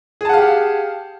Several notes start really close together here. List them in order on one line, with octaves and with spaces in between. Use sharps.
G#4 A5 F#5 F5 G4